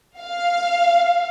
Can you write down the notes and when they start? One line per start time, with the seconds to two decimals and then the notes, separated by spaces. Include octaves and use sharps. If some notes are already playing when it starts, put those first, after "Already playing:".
0.21 F5